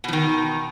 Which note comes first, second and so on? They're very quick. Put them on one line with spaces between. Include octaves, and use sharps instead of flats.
B2 F3 D#3